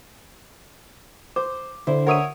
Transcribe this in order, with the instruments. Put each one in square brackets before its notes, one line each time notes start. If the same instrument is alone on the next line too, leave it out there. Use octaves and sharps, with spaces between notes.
[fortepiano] C5 [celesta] D6
[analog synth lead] D3 [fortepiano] E4 [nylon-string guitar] C5
[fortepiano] A#4 C#5 E5 [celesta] F#5 D#6 D#7